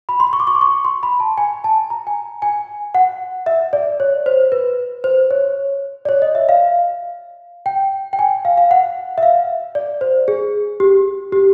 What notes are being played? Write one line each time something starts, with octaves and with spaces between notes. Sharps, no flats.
B5
C6
C#6
D6
C#6
D6
C#6
C6
B5
A5
G#5
A5
A#5
G#5
G#5
F#5
E5
D5
C#5
C5
B4
C5
C#5
D5
C#5
D#5
E5
F5
G5
G5
G#5
F5
F5
F#5
E5
F5
D5
C5
G#4
G4
G4